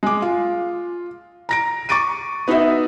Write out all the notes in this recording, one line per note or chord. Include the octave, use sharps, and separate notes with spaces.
G#3 D6
F4
A#5 A#6 D7
C#6 D6 A6 D7 D#7
B3 D#4 F#4 B4 E5